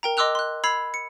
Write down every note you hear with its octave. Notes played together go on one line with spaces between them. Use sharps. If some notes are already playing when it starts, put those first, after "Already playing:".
A#4 G5 A#5
D#5 C6 D6 E6 F#6 F7
C6 F#6
B5 E6 G#6 C7 F7
C#7